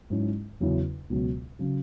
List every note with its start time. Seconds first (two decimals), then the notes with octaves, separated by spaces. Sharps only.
0.10 G#2 F#3 C#4 E4
0.60 E2 C#3 F#3 C#4 E4
1.10 C#2 B2 F#3
1.59 C#3 F#3